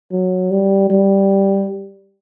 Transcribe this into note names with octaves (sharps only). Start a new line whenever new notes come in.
F#3
G3
G3